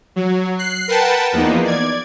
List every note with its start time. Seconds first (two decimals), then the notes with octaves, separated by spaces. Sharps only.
0.16 F#3
0.59 F#6 C7
0.88 A#4 B4 F#5 G5 A5
1.32 E2 F3 A#3 B3 D#4
1.64 D5 G#6